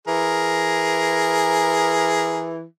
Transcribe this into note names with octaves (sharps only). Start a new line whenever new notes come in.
E3 G#4 A#4